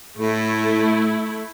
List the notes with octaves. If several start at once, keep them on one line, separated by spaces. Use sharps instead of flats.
A2 A3 E4